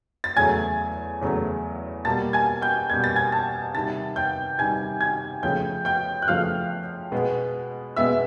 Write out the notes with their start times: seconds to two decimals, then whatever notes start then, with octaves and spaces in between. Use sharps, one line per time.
0.24 A6
0.36 E2 C#3 F#3 A3 G#5 G#6
1.21 E2 C#3 F#3 A3
2.05 B2 G3 A#3 A5 A6
2.33 G#5 G#6
2.62 G5 G6
2.89 B2 G3 A#3 G#6
3.04 A6
3.16 G#5 G#6
3.32 A5 A6
3.74 C3 D#3 G3 A5 A6
4.16 G5 G6
4.58 C3 D#3 G3 G#5 G#6
5.01 G#5 G#6
5.43 C#3 F3 A3 G5 G6
5.85 G5 G6
6.22 F#6
6.27 C#3 F3 A3 F5 F6
7.12 B2 G#3 B3
7.96 B2 G#3 B3 E5 E6